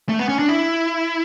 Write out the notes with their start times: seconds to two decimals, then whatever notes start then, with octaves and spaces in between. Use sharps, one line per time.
0.09 A3
0.19 B3
0.29 C#4
0.39 D4
0.49 E4